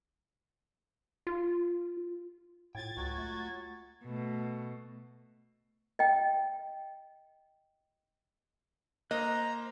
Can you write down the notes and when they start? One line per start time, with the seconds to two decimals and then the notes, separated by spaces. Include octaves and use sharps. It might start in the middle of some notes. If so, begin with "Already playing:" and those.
1.27 F4
2.75 A2 F4 G5 G#6 A6
2.97 C#2 F#3 F#4
3.18 A3
4.04 B2 A3
5.99 D#5 G5
9.11 A#3 C5 D#5 A#5 F#6